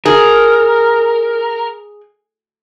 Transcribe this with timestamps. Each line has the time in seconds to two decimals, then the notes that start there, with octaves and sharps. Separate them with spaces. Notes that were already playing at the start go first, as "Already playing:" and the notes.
0.06 G#4 A#4